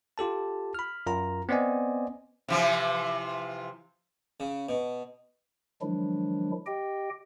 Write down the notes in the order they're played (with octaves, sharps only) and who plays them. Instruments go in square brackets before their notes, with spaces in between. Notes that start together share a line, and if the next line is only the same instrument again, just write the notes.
[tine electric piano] F4 G4 A4 A5
B5 F6
F#2 F4 A#4 A#5
B3 C4 C5 D5 D#5 G#5
[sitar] C3 E3 F3
[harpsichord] C#3
B2
[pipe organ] D#3 F3 F#3 G#3 D4 E4
G4 D#5 G5